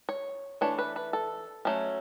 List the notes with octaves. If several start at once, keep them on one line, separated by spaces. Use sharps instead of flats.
C#5
E3 A3 D4 C#5
B4
B4
A4
F#3 A3 C#4